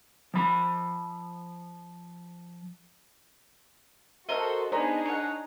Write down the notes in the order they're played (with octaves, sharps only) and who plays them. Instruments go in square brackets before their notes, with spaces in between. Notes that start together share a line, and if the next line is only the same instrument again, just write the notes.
[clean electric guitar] F3 B5
[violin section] F#4 A4 [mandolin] A#4 C5 D#5 [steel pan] E5
[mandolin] B3 [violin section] D4 D#4 G#4 [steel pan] C5 D5 A#5
[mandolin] C#5 F#5